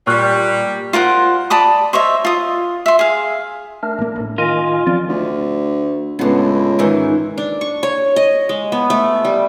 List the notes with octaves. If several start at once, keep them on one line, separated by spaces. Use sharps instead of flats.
A#2 G3 C#6 F6 F#6
F4 A#4 C5 F#5
D5 A5 B5 D#6
C5 C#5 D#5 E5
F4 D#6
E5 C6
G#4 F5
A3 D4 A#4
A1 A#3
A1 A2
D#3 F4 D#5 G#5
F3 C4 D5
D2
C#2 A2 B3
G#2 D#3 E3
D4
C#6
C#5
D#5
G#3
B3
A3
G3